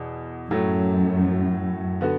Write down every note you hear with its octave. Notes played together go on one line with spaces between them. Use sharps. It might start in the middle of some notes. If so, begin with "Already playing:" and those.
Already playing: E2 B2
F#2 A2 F#3 A3 E4
D3 B3 F#4